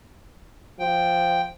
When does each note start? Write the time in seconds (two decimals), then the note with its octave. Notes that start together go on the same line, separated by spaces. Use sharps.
0.79 F3 G5